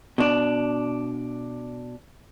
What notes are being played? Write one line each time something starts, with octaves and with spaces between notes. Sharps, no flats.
B2 D4